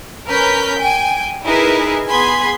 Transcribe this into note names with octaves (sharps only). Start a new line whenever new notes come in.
C#4 A#4 B4 F6 G6 B6
G5 G#5
D#4 E4 G#4 A#4 B4
B3 G#4 G#5 B5 C6 G#6